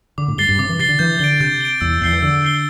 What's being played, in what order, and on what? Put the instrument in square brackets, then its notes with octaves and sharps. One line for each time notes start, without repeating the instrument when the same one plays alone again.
[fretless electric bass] D3 [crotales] D6
[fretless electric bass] A2
[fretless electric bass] G2 [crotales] A6 C7 G7
[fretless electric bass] G2
[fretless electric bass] C3 [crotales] D6
[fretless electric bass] E3
[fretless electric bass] C3 [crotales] A6 C7 G7
[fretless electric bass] D3
[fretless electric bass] E3 [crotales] G6
[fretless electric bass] D3 [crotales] D7 G7
[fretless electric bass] C3 [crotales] G6
[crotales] D7 G7
[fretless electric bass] E2 [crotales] E6
[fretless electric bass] E2 [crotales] G6 C7 G7
[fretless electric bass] E3
[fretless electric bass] D3 [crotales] E6
[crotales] G6 C7 G7